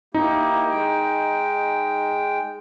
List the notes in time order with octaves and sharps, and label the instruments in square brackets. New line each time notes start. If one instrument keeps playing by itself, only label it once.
[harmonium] A#3 E4 G4 [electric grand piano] D#4
[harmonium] G#3 G5